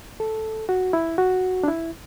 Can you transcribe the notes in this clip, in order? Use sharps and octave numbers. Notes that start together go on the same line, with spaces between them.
A4
F#4
E4
F#4
D4
E4